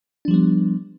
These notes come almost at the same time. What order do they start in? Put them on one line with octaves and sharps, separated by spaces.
D4 F3 G3 B3